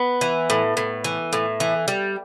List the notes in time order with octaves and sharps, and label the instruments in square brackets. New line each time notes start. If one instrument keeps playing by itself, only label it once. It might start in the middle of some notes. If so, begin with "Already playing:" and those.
Already playing: [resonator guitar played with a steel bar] B3
[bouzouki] E3
A2
A2
E3
A2
E3
G3